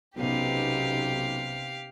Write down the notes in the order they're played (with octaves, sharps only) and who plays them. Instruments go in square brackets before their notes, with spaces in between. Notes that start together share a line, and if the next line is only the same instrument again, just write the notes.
[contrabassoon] B1 [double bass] C3 [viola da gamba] B3 C#4 D#4 [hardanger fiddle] G4 F5